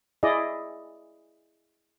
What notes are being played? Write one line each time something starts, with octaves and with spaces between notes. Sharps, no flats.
E4 G#4 D5 D#5